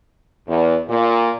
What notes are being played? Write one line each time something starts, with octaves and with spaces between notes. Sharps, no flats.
E2
A#2